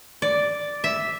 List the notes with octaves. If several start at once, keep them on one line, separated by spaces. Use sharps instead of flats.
D5
E5